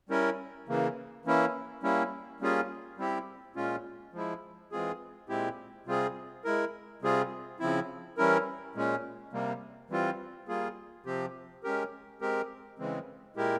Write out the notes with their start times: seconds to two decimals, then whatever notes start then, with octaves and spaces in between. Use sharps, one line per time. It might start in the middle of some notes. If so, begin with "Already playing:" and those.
0.09 G3 C#4 E4 A#4
0.68 C#3 E3 A#3
1.25 E3 A#3 C#4 E4
1.83 G3 A#3 C#4 E4
2.40 G3 A#3 C#4 F4 G#4
2.98 G3 C4 E4 G4
3.56 A#2 G#3 C#4 F4
4.13 F3 G#3 E4
4.72 E3 G#3 C4 F4 G#4
5.29 A#2 G#3 C4 E4 G4
5.86 C3 G3 C4 F4 G#4
6.45 G#3 E4 A#4
7.02 C3 G3 C4 F4 G#4
7.60 C#3 F3 C4 E4
8.17 E3 G3 C#4 E4 A#4
8.75 A#2 G#3 C#4
9.33 C3 G3 A#3
9.90 E3 G3 C4 F4
10.48 G3 A#3 F4 G#4
11.06 C3 F3 C4 G4
11.64 G#3 C#4 G4 A#4
12.21 G#3 C4 G4 A#4
12.79 C#3 E3 G#3 C4
13.36 A#2 G#3 E4 G4 A#4